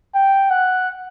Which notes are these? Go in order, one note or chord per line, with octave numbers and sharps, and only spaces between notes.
G5
F#5